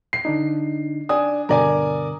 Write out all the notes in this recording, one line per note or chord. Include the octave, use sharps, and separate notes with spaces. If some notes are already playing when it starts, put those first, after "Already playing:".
C7
D3 D4 D#4
D4 G#5 D#6
G2 B2 D3 A#4 D5 G#5